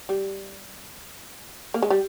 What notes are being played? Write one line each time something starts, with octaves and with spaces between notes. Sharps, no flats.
G3
A#3
G#3
G3